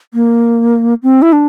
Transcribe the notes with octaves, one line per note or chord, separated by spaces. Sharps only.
A#3
C4
E4
D4